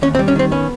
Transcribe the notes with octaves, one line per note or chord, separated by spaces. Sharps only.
D#2 C#4
C4
G3
C#4
D#3 C4
B3 C#4